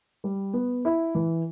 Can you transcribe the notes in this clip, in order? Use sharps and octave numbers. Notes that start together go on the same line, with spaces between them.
G3
B3
E4
E3